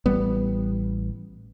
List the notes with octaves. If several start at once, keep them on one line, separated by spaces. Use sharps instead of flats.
A1 G3 B3